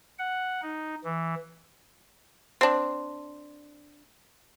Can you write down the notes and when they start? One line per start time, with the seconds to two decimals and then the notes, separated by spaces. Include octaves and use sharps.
0.19 F#5
0.62 D#4
1.04 E3
2.61 C4 D4